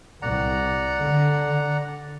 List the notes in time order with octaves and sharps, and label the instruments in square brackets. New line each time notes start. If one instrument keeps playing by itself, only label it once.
[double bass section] C2 [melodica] D5 F#5 A#5
[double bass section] D3